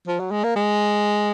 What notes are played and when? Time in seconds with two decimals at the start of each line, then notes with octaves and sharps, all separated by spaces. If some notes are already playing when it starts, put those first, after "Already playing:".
0.08 F3
0.20 F#3
0.31 G#3
0.44 A#3
0.56 G#3